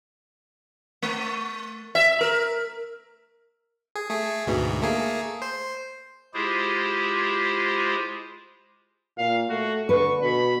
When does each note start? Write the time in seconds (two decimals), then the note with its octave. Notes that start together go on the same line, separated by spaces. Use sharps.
1.02 A3
1.95 E5
2.21 A#4
3.95 G#4
4.10 A3 G#4
4.46 D2 G#2 B2
4.82 A3 A#3 G#4
5.42 C5
6.34 G#3 E4 F4 G4 G#4 C5
9.18 A#2 F5
9.50 A3 F#4
9.89 D3 B4 C#6
10.22 B2 B5